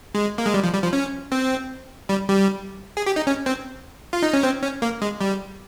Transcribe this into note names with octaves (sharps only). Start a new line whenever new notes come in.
G#3
A#3
G#3
G3
F3
G3
F3
C#4
C4
G3
G3
G#4
G4
D#4
C#4
C4
F4
D#4
C#4
C4
C#4
A#3
G#3
G3